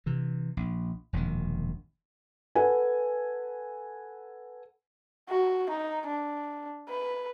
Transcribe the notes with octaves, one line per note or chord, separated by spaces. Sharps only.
C3 E3
A#1
E1 A#1 F#2 D#3
A4 B4 F#5 G#5
F#4
D#4
D4
B4